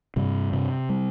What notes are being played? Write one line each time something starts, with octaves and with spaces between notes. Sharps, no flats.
G2 C3 G3
C3
G3